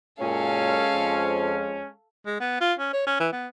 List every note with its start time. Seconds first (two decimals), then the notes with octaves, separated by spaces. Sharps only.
0.20 F#2 A#2 G#3 C#4 A4 F5
0.94 F2 F3
2.26 G#3
2.40 B3
2.61 F4
2.79 C#4
2.93 C#5
3.07 C#4
3.20 E3
3.33 B3